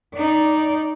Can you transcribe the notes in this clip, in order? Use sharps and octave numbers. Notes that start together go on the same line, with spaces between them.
D#4 D5